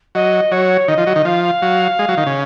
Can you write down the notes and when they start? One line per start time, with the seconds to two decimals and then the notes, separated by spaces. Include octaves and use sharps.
0.15 F#3 D#5
0.51 F#3 C#5
0.88 D#3 D#5
0.98 F3
1.07 F#3
1.16 D#3
1.25 F3 F5
1.43 F5
1.62 F#3
1.99 G#3
2.08 F#3
2.17 D#3
2.26 C#3